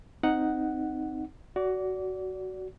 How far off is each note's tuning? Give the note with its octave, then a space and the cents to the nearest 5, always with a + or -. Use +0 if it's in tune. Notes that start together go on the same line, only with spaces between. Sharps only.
C4 +0 D#4 +0 F#5 +0
F#4 +10 D5 -25